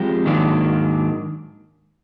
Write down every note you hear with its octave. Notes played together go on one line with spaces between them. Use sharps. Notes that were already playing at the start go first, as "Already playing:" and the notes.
Already playing: F3 G#3 C4 G4
G#2 D#3 F#3 A#3 D4